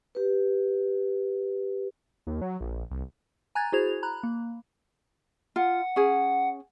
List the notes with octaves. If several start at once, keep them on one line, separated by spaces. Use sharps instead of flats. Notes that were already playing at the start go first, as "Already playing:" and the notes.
G4 B4
D#2
F#3
A#1
C2
G#5 A#5 F#6 G#6 A6
E4 F#4 G#4 C5 G#6 F7
A#5 B5 F#6
A#3
F4 F#5
C#4 G#4